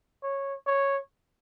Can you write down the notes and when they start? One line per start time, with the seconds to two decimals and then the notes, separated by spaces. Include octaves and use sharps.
0.23 C#5
0.67 C#5